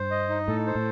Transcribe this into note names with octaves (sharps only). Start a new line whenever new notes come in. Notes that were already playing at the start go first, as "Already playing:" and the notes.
Already playing: G2 C5
D#5
D#4
A2 A4
C5
A2